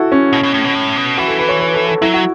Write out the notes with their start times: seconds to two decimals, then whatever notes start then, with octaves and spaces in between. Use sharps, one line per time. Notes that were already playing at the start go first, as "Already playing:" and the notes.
Already playing: E4 F#4 A4
0.12 C#4
0.33 B2
0.43 B2
0.54 A2
0.64 B2
0.75 A2
0.96 B2
1.17 E3 F#4
1.28 A4
1.39 B4
1.49 C#5
1.60 B4
1.74 A4
1.88 A4
2.02 F#3 E4
2.14 F#4